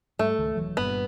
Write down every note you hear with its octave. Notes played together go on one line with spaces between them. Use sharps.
G#2 G3 A3
C#2 D#3
E1 E3 F#3
G1 G2 A#2 B3